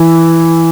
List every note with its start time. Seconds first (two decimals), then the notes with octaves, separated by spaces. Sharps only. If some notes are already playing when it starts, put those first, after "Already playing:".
Already playing: E3